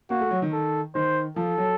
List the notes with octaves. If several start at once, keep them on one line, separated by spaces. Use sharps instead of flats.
A#3 F#4
A3
F#3
D#3
A4
D#3 C5
F3 A4
F#3